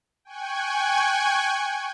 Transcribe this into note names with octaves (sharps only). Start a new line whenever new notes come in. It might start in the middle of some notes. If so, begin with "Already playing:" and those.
G5 G#5 C#6 F#6 G#6